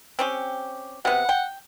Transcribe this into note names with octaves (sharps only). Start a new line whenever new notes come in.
C4 C#4 G4
C3 B3 F#5
G5